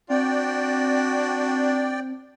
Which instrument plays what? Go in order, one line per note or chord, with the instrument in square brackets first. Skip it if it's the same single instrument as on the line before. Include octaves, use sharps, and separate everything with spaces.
[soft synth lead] C4 [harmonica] D4 F#4 [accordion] D5 G5